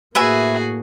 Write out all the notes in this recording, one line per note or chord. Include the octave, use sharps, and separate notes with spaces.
A2 A#3 F#4 G#4 B4 E5 G#5